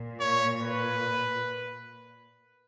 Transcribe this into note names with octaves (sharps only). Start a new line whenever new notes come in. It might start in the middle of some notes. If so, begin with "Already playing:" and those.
Already playing: A#2
C#5
B4